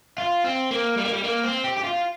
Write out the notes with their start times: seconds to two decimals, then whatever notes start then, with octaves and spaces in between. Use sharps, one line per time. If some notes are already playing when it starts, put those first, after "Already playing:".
0.18 F4
0.44 C4
0.71 A#3
0.97 G3
1.05 A#3
1.12 G3
1.24 A#3
1.43 C4
1.64 G4
1.77 G4
1.84 F4